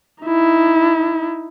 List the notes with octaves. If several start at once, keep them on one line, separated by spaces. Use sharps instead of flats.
D#4 E4